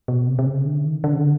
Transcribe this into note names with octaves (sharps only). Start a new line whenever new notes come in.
B2
C3
C3
C#3
D3
D#3
D3
C#3
D3